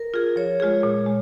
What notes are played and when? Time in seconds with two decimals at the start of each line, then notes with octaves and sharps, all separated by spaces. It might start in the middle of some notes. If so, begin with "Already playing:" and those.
Already playing: A#4
0.14 F4 G#4
0.36 F3 C#5
0.60 G#3 F4 G#4
0.83 A#2
1.06 G#3